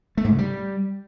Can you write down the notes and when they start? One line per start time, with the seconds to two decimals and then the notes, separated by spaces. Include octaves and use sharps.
0.18 A3
0.24 G#2
0.31 C#3
0.38 G3